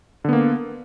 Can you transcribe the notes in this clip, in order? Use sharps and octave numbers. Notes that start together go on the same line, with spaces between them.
D3 A#3 B3